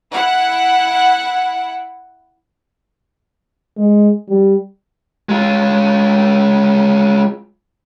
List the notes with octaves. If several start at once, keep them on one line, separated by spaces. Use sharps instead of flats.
E4 F#5
G#3
G3
G#3 F4